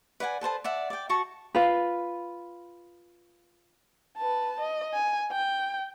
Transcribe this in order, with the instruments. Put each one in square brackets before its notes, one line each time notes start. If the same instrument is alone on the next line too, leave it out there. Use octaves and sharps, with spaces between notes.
[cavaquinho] B4 D5 F#5 G#5
A4 B4 C5 A5
D5 E5 F#5
D5 G5
F#4 A5 C#6
[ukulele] F4 B4
[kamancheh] B4 A5
D#5
G#5
G5